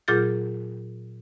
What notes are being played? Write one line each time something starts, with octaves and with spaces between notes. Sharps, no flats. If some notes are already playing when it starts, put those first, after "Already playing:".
A#2 F#3 F4 G#4 G6 A6